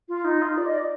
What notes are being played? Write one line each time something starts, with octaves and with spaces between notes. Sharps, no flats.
F4
D#4
F4
D5
D#5
D5